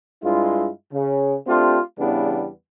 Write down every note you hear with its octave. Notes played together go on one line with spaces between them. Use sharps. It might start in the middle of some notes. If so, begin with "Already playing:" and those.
G2 G#3 E4 F4
C#3
A3 C4 D4 F4 G4
E2 C#3 E3 G3 B3 D4